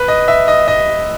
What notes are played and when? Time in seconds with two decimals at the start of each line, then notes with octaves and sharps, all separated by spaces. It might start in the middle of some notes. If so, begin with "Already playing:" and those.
Already playing: B4
0.08 D#5
0.28 E5
0.48 D#5
0.68 D#5